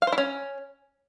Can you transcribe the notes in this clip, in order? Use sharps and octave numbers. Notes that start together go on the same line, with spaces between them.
F5
C5
E4
C#4